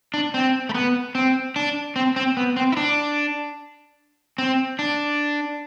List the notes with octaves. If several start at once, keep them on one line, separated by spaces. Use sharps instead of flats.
D4
C4
A3
B3
C4
D4
C4
C4
B3
C4
E4
D4
C4
D4